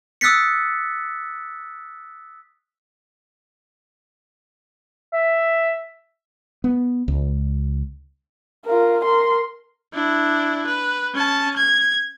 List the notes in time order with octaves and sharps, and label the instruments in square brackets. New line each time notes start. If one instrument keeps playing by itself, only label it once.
[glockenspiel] D#6 E6 F#6 A6 B6 C#7
[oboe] E5
[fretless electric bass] B3
C#2
[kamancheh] F4 A#4
A#4 C6
[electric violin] D4 E4
B4
C#4 A5
G#6